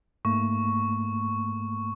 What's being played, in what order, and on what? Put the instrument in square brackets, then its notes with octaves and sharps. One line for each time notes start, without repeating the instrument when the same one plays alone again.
[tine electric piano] G#2 A3 A#3 [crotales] C#6